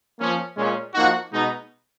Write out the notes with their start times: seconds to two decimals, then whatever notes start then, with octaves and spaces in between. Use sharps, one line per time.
0.19 F3 A#3 C#4
0.57 A#2 G#3 C#4
0.94 F3 A#3 D#4 F#4
1.32 B2 G#3 B3 D#4